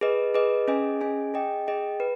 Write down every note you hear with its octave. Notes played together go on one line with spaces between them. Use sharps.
G#4 B4 D#5
G#4 B4 D#5
C#4 G#4 D#5 G#5
C#4 G#4 D#5 G#5
G#4 D#5 G5
G#4 D#5 G5
B4